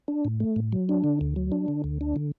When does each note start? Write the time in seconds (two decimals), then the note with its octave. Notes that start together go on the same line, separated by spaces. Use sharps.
0.08 D4
0.25 A2
0.40 A3
0.56 A2
0.72 F#3
0.89 D4
1.04 D3
1.21 D2
1.36 F#3
1.52 D4
1.68 D3
1.84 D2
2.01 D4
2.16 D3